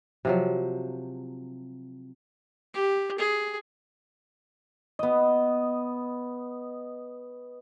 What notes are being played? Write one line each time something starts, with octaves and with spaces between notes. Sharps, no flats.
C3 F3 F#3
G4
G#4
B3 D#5